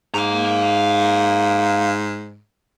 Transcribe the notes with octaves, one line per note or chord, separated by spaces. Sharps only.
G#2 F5 A#5